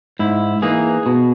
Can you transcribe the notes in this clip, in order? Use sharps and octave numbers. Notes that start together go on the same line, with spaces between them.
G#2 E4
E3 A#3 D#4 G#4
B2